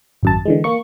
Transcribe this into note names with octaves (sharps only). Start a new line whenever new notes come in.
G#1 F#2 A5
D3 E3 G#3
A#3 C#6